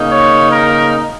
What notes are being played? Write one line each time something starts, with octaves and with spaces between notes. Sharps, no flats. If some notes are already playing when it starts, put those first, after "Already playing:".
Already playing: C#3 A#3 D#4
C#5
A#4